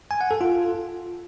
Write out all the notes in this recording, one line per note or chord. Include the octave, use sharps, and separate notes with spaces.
G#5
F#5
A4
F4